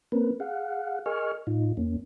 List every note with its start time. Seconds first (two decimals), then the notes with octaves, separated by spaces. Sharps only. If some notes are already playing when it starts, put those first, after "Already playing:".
0.12 A#3 C4 C#4 A#4 B4
0.40 G#4 F5 F#5
1.06 G#4 A#4 D#5 G#5 C#6 F6
1.47 A2 D#4 F4
1.77 E2 A#3 C#4